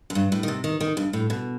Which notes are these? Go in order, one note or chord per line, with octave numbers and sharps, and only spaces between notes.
F#2
G2
A2
D#3
C3
D#3
D#3
G2
A2
B2